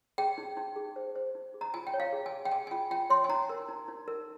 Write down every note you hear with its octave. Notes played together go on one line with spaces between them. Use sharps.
G#4 G5
D#4
D#4
G#4
C5
C5
D#4
G#4
A#5
F4 G#5
G5
C#5
F5
G#4
G#5
G#4
G5
G#4 G#5
G#5
F4 G5
F4 G5
C#5 C6
G#5
D#4 A#5
A#4
D#4
D#4
A#4